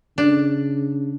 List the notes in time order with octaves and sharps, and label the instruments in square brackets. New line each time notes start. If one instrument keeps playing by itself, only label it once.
[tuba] C#3 [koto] D4